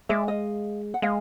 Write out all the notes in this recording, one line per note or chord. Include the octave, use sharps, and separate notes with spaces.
G#3 D5 E5
D#5 F5
F#5
G#3 D#5 F5